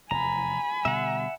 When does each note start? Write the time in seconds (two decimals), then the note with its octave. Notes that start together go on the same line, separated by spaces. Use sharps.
0.11 F1 E2 G#5 A#5 B5
0.85 B2 D3 G3 E5 F#5